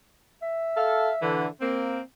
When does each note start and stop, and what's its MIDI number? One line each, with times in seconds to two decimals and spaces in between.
0.42 1.52 76
0.77 1.10 69
0.77 1.10 77
1.22 1.46 50
1.22 1.46 52
1.61 2.00 58
1.61 2.00 60